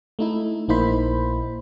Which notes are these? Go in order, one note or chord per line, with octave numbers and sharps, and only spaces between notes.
A3 D#4 E4
A#1 A#3 D#4 E4 C5 B5